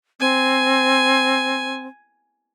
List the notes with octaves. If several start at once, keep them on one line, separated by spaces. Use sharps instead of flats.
C4 G#5